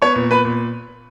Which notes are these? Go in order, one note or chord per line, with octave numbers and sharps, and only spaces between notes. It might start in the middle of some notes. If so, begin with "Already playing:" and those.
B3 C#5 C#6
A#2
B3 B4 B5
A#2